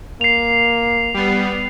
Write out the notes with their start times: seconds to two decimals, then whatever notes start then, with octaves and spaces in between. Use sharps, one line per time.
0.21 A#3 C7 F7
1.14 G3 B3